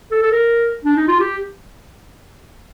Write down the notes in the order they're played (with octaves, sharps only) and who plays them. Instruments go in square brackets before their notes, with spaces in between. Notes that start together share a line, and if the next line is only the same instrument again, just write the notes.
[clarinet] A4
A4
A#4
D4
D#4
F4
G4